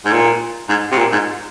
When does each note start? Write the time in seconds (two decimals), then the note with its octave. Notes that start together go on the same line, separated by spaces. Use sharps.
0.06 G#2
0.12 A#2
0.69 G#2
0.92 C3
0.98 A#2
1.12 G#2